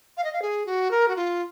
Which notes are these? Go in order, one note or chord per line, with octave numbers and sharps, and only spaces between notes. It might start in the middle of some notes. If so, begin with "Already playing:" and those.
F5
D#5
F5
G#4
F#4
A#4
F#4
F4